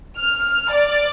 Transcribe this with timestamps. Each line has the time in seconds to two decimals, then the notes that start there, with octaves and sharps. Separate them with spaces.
0.18 F6
0.71 D5